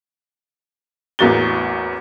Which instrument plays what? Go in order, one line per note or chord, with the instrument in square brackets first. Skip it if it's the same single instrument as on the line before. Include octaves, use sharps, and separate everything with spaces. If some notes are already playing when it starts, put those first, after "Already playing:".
[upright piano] A1 E2 A#3 F#4 A6 G7